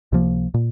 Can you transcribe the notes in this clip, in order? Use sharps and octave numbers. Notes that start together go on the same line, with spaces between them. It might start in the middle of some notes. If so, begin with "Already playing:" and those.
C#2 C3 F3 A#3
A#2